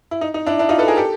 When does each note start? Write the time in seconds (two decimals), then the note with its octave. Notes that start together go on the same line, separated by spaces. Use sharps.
0.11 E4
0.21 D#4
0.34 D#4
0.46 D4 E4
0.59 D4 E4
0.69 D#4 F4
0.78 A4 B4
0.88 G#4 A#4
0.97 G4 A4